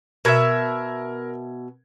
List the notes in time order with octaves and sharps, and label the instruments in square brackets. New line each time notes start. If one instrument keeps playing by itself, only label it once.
[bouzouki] B2 E5 [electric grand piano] A#4 G#6